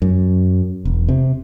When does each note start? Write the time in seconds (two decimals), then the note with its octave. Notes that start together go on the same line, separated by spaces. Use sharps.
0.02 F#2
0.85 E1
1.09 C3